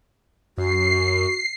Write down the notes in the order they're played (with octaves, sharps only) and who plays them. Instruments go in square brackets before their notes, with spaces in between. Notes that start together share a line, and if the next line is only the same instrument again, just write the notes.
[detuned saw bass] F#2 [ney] F#4 [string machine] C7